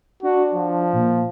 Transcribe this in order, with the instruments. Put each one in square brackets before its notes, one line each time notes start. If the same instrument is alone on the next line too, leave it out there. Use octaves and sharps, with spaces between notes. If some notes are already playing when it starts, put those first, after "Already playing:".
[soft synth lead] D4 [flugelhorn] F#4
[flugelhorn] F3
[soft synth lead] A#2